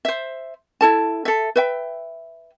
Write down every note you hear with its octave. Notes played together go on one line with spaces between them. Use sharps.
C5 E5
E4 A4 A5
A4 E5
B4 E5 G5